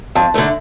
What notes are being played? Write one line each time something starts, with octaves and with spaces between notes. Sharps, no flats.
F2 A5
D3 A3 D#4